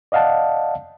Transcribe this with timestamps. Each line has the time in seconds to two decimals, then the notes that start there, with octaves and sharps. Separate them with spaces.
0.12 D5 D#5 F5 F#5 A5